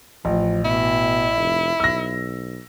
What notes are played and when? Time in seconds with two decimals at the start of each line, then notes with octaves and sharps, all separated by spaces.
0.25 A1 F3
0.65 B2 E4
1.36 F1
1.80 B1 E6 A#6